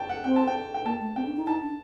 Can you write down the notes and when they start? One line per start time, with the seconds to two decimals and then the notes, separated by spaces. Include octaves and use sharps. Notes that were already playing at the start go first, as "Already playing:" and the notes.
Already playing: G5 A5
0.09 F#5
0.24 C4 G5
0.36 A5
0.47 G5
0.74 G5
0.85 A#3 A5
1.00 A3
1.16 C4 G5
1.26 D4
1.36 D#4
1.47 D#4 A5
1.62 D4